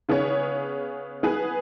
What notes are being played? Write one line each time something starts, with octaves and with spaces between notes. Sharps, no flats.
C#3 B3 G#4 C#5
B3 G#4 B4